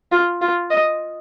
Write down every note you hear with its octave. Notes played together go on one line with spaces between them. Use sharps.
F4
F4
D#5